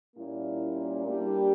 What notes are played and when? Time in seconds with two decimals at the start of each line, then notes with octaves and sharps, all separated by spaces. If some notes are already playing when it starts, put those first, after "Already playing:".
0.16 A#2 G3 A#3 C#4 E4
1.06 G3 A#3 D4 G4